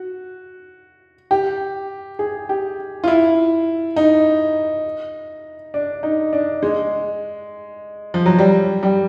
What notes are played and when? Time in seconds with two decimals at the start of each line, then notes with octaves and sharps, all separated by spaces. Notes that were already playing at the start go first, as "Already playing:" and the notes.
Already playing: F#4
1.31 G4
2.19 G#4
2.49 G4
3.04 F4
3.08 E4
3.96 D#4
5.74 D4
6.03 D#4
6.33 D4
6.63 G#3
8.14 F3
8.26 F#3
8.39 G3
8.83 G3